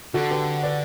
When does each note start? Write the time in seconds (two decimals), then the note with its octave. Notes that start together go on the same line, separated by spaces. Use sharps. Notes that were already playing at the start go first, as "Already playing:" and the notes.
0.14 D3 F#4 A4
0.31 G4 B4
0.63 B4 D5